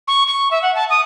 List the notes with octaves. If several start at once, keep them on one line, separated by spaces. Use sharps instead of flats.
C#6
C#6
E5
F#5
A5
D#6